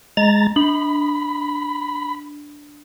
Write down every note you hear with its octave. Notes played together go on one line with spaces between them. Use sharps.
G#3 A#5 A6
D4 B5